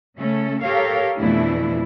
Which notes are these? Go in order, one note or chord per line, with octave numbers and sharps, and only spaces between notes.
C#3 A3 C#4 A4
G4 A4 A#4 C#5 F5
F2 B2 E3 A3 D4 E4